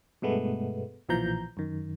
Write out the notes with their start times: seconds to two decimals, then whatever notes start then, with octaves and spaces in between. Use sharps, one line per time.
0.22 G2 B2 G#3 A3 B3
1.09 B1 A#2 E3 F3 A#5 G6
1.57 F#2 D#3